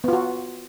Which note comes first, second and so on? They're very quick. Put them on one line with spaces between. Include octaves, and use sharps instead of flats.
B3 F4 F#4